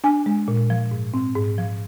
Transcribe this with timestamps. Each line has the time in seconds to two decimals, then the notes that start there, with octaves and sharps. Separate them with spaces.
0.04 D4 G#5
0.26 G#3
0.48 A#2
0.70 F3
0.91 G#2
1.14 C4
1.35 G#2
1.58 F3